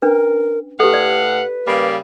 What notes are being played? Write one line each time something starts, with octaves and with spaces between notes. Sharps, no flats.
C#4 D4 A#4 B4
A2 G4 A4 B4 F5 F#5
D5
C#3 G3 A#3 B5